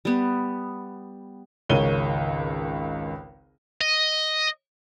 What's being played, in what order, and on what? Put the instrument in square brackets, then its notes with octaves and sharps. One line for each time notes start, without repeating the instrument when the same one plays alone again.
[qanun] G3 B3
[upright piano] G#1 C#2 A#4 C#5 D#7 G7
[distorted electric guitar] D#5